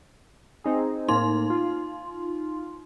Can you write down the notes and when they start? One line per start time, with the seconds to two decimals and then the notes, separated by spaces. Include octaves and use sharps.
0.64 C4 D#4 G#4
1.08 A2 A#3 D#4 C6
1.50 F4